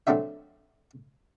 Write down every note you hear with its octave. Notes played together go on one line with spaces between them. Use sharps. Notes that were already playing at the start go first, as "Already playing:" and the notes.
F#3 A3 C4 D4 F#4 E5